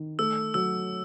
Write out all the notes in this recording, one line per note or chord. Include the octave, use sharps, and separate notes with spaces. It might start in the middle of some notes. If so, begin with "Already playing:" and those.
Already playing: D#3
A3 E6
F#3 E6